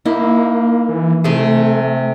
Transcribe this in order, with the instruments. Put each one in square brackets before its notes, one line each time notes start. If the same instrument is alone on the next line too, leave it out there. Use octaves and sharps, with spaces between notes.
[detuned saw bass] A#3 [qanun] D#4 E4
[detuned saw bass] E3
[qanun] C3 G#4 [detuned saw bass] A3